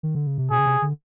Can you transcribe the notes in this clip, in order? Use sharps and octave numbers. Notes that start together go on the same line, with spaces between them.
D#3
D3
C#3
C3
B2 G#4
C#3
C3
D3